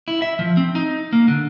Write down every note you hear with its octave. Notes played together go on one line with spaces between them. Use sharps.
E4
E5
F3
C4
D#4
A#3
D3